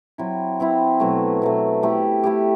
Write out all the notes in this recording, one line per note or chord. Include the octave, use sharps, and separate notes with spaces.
F#3 C4 E4
F#3 C4 E4
B2 F#3 A3
B2 F#3 A3
A3 E4 G4
A3 E4 G4